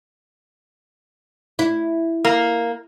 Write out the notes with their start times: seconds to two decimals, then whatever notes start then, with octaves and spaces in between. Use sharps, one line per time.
1.59 E4
2.25 A#3